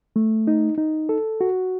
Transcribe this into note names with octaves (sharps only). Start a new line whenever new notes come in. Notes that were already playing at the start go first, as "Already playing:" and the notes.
A3
D#4
D#4
A4
F#4